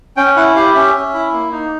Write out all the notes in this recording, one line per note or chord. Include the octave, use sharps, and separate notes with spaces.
C#4 G5
E4 F#5
G4 F5
C#4 E5
C#4
E4
A#3
D#4